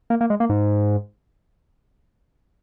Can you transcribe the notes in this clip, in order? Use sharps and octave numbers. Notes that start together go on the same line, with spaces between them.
A#3
A#3
G#3
A#3
G#2